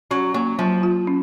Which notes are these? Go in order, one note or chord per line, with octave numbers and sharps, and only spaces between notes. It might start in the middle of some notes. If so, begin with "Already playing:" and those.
F#3 C#4
F#3 A#3
F3 F#3
F4
C#4